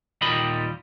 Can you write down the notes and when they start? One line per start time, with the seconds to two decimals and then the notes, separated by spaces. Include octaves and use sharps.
0.21 D#2 A#2 G3 D#5 B5